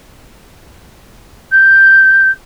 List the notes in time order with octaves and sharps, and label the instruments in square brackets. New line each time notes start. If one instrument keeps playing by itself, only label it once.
[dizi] G6